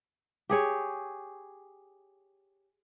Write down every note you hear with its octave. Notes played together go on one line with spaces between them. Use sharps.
G4 G#4 C#5